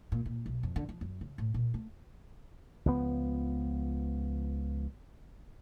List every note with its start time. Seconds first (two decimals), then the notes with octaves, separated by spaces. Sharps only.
0.12 A#2
0.26 A#2
0.46 B1
0.63 F2
0.76 D3
0.89 F3
1.01 F#2
1.21 C#3
1.38 A2
1.54 A#2
1.74 A3
2.86 C#2 F3 B3